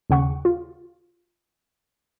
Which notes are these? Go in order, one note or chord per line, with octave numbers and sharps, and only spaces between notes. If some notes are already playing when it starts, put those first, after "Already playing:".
D#2 C#3 F#5 C#6
F4